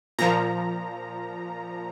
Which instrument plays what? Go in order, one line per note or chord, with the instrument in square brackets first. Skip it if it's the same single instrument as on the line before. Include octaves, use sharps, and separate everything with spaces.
[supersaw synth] A#2 F3 A#5